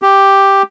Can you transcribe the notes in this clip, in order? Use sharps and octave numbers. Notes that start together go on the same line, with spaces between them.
G4